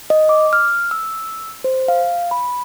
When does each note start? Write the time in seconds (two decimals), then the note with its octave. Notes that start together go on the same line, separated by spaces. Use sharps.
0.10 D#5
0.29 D6
0.53 F6
0.91 E6
1.64 C5
1.88 F5
2.31 B5